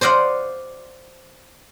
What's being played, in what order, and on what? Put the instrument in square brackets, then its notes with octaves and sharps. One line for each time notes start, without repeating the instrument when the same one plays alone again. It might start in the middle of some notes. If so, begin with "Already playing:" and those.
[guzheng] C5 D5 D#5 F5 F#5